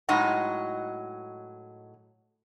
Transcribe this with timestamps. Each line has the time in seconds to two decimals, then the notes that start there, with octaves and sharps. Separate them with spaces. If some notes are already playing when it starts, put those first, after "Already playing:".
0.09 A2 F#3 G#3 D#4 F#4 F#5